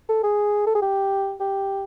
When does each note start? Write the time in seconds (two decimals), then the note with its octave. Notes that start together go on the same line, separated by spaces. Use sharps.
0.09 A4
0.23 G#4
0.67 A4
0.75 G#4
0.82 G4
1.40 G4